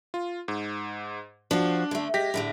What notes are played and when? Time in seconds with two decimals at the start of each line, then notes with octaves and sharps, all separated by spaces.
0.14 F4
0.48 G#2
1.51 F3 D4 F#4
1.91 D3 A3
2.14 G#3 G4 A#6 B6
2.34 A2 D3 A3